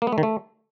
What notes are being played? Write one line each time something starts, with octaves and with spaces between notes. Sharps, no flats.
A#3
B3
A3
D#3
A3